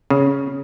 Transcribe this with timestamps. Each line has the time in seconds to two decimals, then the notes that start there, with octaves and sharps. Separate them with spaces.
0.10 C#3